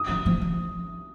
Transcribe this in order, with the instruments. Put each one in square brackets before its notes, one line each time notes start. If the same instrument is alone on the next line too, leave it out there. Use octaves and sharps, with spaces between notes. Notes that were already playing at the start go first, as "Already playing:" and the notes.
Already playing: [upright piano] D#6
[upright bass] F3
F3
F3